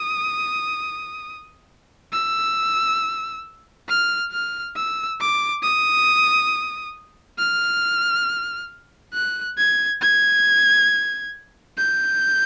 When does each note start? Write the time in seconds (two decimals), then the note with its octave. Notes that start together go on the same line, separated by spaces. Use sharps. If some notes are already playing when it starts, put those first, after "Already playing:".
Already playing: D#6
2.13 E6
3.89 F6
4.32 F6
4.76 E6
5.20 D6
5.63 D#6
7.38 F6
9.14 F#6
9.58 G#6
10.02 G#6
11.77 G6